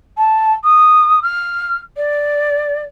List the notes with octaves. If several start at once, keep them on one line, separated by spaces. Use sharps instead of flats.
A5
D#6
F6
D5